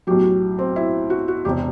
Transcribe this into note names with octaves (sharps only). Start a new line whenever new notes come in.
B1 A2 F#3 G4
C4
E4
F#4
F#4
E1 C3 G4